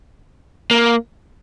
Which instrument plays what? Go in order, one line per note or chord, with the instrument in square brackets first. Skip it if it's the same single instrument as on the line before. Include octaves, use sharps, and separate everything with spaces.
[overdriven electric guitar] A#3